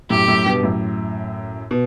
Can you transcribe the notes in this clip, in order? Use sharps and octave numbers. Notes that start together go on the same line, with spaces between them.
F#2 A2 G4
F#2 A2
G2 B2
F#2 A2
B2